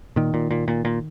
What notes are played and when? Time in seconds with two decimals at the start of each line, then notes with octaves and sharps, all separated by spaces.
0.16 A#2 D#3
0.34 A#2
0.51 A#2
0.68 A#2
0.85 A#2